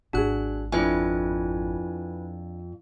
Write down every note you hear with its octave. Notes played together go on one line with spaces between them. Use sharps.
G#1 D4 F#4 G#4 F#6
F2 D4 E4 B4 E5 G#5